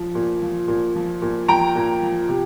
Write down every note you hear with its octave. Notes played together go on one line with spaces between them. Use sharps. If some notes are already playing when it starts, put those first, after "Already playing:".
Already playing: F3
A#2
F3
A#2
F3
A#2
F3 G5 A#5
A#2
F3
C3